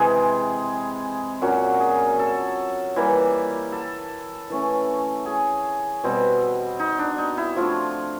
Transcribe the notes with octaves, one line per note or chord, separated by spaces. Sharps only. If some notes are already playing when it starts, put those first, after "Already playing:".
Already playing: C3 E3 G#3 G#4
A#2 F#3 A#3 C#4 F#4
G#4
A4
E3 G3 A#3
A4
E3 A3 C#4
G#4
B2 G3 C4
D#4
D4
D#4
E4
F3 A3 D4 F4